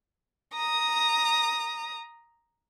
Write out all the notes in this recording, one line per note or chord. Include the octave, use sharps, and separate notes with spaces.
A#5 D#6